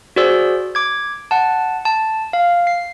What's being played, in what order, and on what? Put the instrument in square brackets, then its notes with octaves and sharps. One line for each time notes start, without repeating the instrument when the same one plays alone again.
[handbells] F#4 G#4 C5 D5 E6
D6 G#6
F#5 A5
A5
F5
C7